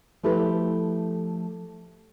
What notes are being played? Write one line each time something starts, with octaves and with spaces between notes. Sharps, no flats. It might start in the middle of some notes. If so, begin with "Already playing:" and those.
F3 A3 E4 G4 A4 B4